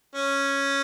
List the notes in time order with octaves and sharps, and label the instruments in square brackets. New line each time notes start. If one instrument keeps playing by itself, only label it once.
[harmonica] C#4